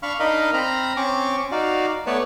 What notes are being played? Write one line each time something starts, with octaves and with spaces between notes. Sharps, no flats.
D4 F5 B5 C#6 F6
D4 D#4 A#4 D#5 F5 B5
C4 A#5 B5 F6
C4 C#4 C#6 D6
D#4 F#4 D5 F5
A3 B3 B4 C#5 D5 A5